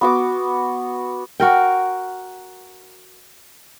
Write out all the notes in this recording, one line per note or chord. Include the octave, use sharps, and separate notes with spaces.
B3 F#4 D6
F#4 A#4 G5